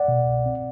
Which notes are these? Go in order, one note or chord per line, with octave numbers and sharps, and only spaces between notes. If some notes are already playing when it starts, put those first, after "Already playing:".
Already playing: D5 F#5
B2
C2
C4